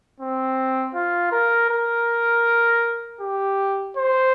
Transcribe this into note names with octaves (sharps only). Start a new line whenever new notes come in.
C4
F4
A#4
A#4
G4
C5